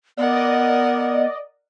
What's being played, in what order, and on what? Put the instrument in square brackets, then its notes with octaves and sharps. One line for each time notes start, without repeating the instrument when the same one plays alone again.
[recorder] B3 [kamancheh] A#4 F#5 [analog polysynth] D5 D#5